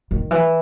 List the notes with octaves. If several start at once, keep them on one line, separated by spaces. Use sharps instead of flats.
D#3
E3